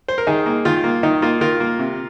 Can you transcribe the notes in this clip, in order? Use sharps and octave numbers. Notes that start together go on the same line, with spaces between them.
C5
A#4
D#3 D#4 G#4
A#3
D#3 F4
A#3
D#3 D#4
A#3 F4
D#3 F4 A#4
A#3
C3